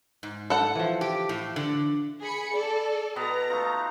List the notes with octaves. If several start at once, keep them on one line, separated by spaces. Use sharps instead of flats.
G#2
A4 F#5
E3 F3
G4
A2
D3
G#4 B5 C#7
A4 D5
B2 B3 D5 A#5
A3 D#4 F4